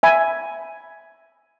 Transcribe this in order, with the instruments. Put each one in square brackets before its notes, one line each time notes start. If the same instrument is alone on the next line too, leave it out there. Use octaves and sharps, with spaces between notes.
[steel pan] E5 G#5 B5